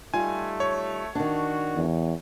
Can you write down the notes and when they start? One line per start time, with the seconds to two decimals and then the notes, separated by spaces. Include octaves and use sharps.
0.14 G3 A3 D#4 F4 G#5
0.60 C#5
1.15 D#3 D4 F#4
1.76 E2